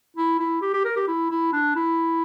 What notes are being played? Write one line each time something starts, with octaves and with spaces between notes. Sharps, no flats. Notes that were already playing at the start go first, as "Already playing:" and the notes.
E4
E4
G4
G4
A#4
G4
E4
E4
D4
E4